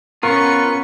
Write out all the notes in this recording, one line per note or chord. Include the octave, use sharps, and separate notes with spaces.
B3 C#4 F4 A#4 C#6